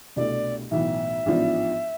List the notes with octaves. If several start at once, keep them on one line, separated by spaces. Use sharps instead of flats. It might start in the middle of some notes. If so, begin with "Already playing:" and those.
C2 B2 A3 D4 D5
B1 A2 E3 B3 E5
A1 G#2 F3 B3 D4